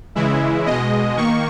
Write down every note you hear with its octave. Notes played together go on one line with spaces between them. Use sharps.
C#3 E3 G#3 E4
B2 G#3 D#5
D#3 A#3 C#6